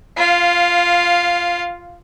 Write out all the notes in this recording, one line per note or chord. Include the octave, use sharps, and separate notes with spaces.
F4 F5